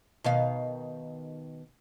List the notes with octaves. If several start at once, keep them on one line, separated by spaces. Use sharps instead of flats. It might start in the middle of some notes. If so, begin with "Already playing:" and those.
B2 D#3 F5